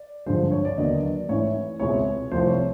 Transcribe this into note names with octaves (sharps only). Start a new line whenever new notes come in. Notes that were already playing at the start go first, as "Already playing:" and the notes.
Already playing: D5
G2 D3 F3 G#3 C5
C#5
D5
D#2 D3 F#3 B3 D#5
D5
G#2 E3 A3 C#4 E4 C#5
C#2 B2 G#3 C4 E4 C#5
C2 C3 F3 A3 C5
C#5